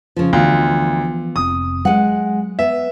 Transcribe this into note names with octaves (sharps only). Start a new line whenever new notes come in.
C#3 F3
D2 E3 F3 B3 F4
F1 C4 D#6
F#3 G#3 F#5
B3 E5